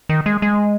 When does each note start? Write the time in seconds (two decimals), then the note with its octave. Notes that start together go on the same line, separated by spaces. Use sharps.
0.09 D#3
0.26 G#3
0.42 G#3